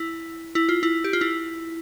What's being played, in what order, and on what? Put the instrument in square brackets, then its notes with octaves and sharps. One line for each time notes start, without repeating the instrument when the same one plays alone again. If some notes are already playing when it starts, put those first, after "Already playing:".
Already playing: [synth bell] E4
E4
F4
E4
G4
F4
E4